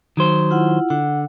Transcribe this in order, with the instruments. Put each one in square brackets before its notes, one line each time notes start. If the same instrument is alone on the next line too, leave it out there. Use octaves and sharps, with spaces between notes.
[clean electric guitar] D#3 F#3 C5
[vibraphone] E4 F4 F#5
[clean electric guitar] D3 [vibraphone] F#5